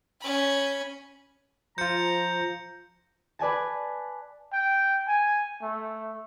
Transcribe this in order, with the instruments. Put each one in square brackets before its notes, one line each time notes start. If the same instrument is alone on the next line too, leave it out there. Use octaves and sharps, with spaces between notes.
[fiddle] C#4 B5
[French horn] F3 [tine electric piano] F4 C5 [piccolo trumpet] A#5 [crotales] G6 C#7
[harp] B4 D5 G#5 A5
[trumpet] G5
G#5
A3